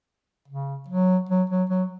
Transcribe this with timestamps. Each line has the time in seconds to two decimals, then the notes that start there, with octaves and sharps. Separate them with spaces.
0.48 C#3
0.88 F#3
1.29 F#3
1.50 F#3
1.70 F#3